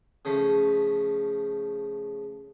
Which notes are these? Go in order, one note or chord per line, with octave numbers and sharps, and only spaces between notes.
C#3 F3 A3